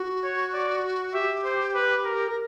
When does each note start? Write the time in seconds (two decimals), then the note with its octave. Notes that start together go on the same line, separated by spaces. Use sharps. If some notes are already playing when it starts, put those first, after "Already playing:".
Already playing: F#4
0.23 C#5
0.54 D5
1.15 G4 E5
1.45 C5
1.75 B4
2.05 A#4
2.28 A#4